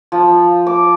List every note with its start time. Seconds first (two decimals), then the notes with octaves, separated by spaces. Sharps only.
0.12 F3
0.67 D6